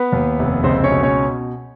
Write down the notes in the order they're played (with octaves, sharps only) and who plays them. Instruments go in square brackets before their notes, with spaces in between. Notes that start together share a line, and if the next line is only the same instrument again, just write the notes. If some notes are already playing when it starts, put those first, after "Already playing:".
Already playing: [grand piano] B3 B4
D#2
F1
C#2 C4 C5
C#4 C#5
B2
C#4 C#5